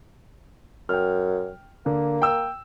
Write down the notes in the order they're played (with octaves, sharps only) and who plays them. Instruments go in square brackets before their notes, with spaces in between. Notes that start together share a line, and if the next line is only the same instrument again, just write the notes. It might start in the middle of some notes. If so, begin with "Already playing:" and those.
[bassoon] F#2 [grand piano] G5 F6
[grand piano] D3 [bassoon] A#3
[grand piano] G5 E6